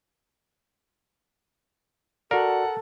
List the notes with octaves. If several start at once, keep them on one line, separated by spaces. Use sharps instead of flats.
F#4 A4 A#4 D5 F#5